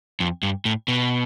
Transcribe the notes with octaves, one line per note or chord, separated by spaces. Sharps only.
F2
G2
A2
B2